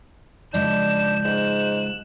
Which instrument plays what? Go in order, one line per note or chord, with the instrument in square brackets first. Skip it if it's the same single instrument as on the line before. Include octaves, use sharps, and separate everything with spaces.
[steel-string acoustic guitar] C#3 F3 G#3 [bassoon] D4 [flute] G6 [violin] E7
[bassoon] G#2 [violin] F#6 E7